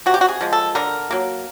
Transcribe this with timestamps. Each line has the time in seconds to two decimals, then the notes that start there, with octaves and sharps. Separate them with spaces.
0.06 C3 F#4
0.14 G4
0.21 F#4
0.28 G#4
0.41 F3 G#3
0.53 A4
0.75 D3 A#4
1.11 F#3 A#3